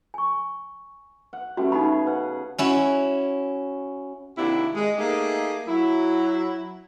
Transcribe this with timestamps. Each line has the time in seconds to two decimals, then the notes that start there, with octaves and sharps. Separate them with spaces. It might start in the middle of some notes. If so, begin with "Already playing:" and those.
0.14 G#5 C#6
1.33 F#5
1.57 G3 A3 B3 C#4 F#4
1.72 C#3 D#4 G#4 F#5 B5
2.07 B4 F#5
2.58 C#4 E4 F#4
4.38 C3 D#3 A#3 D4 E4 F#4
4.75 G#3
4.98 A3 A#3 D#4 G4 G#4
5.68 F#3 E4